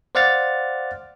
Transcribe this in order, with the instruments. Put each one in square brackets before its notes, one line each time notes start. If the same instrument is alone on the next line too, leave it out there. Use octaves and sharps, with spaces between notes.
[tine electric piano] C5 D5 F5 F#5 F6 A6